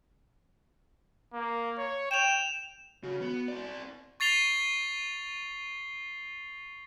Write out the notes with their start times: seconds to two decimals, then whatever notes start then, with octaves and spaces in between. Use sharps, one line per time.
1.33 A#3
1.78 C#5
2.11 G5 E7 F7
3.03 C#3 F#4
3.21 B3
3.48 C4 D5
4.20 C#6 A6 C7 F7 G7